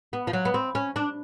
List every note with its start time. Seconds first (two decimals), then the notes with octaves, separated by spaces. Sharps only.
0.13 B3
0.27 F3
0.33 F#3
0.45 B3
0.54 C4
0.75 C#4
0.96 D4